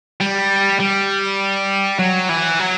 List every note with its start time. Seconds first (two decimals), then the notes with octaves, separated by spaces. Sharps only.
0.21 G3
0.80 G3
1.99 F#3
2.29 E3
2.59 F#3